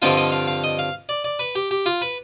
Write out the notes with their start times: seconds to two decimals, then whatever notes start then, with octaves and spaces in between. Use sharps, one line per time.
0.02 G2 D3 F3 C4 F4 D#5
0.17 D#5
0.32 F5
0.47 F5
0.64 D#5
0.79 F5
1.09 D5
1.24 D5
1.39 B4
1.55 G4
1.71 G4
1.86 F4
2.02 B4